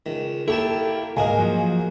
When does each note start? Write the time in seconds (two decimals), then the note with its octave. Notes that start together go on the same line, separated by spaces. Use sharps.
0.06 C#2 D#3
0.48 A#3 E4 G4 A4 C#5 G5 A5
1.17 C2 G#2 G#3 F#4 A#4 D#5 F5 G#5
1.39 F3 F#3